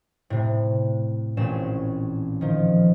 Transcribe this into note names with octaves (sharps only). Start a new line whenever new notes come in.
A2 C3
A1 A#2 C4 C#4 E7
D#3 F3